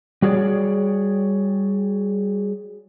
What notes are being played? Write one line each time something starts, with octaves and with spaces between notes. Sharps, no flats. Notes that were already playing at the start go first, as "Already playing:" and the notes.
G3 F#4 G#4 C#5 D5